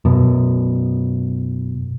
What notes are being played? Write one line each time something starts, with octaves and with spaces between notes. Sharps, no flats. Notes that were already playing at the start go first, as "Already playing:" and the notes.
F#2 B2